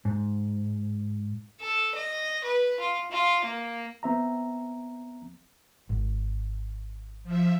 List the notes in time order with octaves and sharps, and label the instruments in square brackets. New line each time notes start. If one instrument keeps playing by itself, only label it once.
[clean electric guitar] G#2
[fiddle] A4
D#5
B4
F4
F4
A#3
[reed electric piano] B3 C4 E5 A#5
[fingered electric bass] G#1
[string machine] F3 E5